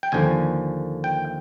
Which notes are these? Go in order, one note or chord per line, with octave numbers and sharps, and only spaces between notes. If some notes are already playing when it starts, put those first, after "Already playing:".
G5
D#2 D3 F3 G#5
G5